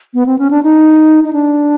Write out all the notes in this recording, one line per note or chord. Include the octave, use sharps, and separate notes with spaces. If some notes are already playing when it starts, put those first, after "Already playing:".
B3
C4
C#4
D4
D#4
D#4
D4